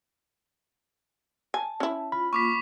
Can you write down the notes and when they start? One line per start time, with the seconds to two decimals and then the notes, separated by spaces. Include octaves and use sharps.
1.54 G#5 A5
1.80 C#4 E4
2.12 F4 B5
2.33 A#3 F4 C#6 D6 B6